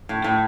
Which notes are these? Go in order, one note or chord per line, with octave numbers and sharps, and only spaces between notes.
A2
A2